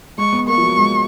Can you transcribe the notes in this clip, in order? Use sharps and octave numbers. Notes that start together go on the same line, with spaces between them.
G#3 C#6
B3
A#3 C#6
F3
F#3
G#3